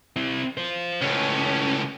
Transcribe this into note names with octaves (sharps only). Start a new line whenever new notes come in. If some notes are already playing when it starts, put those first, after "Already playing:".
C4 E4
F4 C5
C#2 A2 C#4